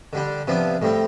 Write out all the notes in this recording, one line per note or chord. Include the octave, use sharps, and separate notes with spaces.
D3 G3 D4
C3 F3 B3 D4
A2 G3 C4